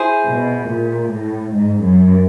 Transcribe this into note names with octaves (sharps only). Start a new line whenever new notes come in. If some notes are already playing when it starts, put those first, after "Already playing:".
Already playing: E4 G#4 C5
B2
A#2
A2
G#2
F#2